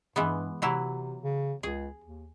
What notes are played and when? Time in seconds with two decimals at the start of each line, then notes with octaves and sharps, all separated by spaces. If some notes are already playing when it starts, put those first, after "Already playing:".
0.16 G2 E3 G#3 B3
0.62 C3 E3 F#3 E4
1.23 C#3
1.63 C#2 G#4
2.04 D#2